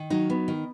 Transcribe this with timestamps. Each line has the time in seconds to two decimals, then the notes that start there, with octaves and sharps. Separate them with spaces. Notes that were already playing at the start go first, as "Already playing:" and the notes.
Already playing: D#3
0.10 F#3 D#4
0.30 B3
0.48 D#3